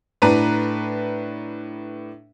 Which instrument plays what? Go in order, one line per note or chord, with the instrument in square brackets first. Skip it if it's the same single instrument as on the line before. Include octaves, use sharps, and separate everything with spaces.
[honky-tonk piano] A2 D4 B4 A#5 D#7